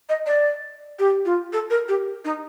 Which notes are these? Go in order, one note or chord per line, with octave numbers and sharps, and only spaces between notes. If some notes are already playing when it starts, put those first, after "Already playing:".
D#5
D5
G4
F4
A4
A#4
G4
D#4